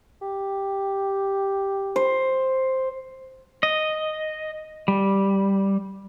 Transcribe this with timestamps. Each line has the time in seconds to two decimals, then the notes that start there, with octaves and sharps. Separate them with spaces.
0.22 G4
1.96 C5
3.63 D#5
4.88 G3